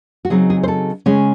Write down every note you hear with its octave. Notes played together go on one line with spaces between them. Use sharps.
F#4
C#3 F#3 C4 D#4 G#4
G#4
C5
A4
C#3 G#3 C#4